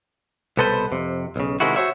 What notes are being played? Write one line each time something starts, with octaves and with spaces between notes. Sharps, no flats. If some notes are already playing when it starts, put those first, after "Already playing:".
C2 B2 B3 A4 B4 C5
F2 C3
B1 C#3
C3 D#3 G#3 E4 F#4
F#4 G#4 C5 C#5 E5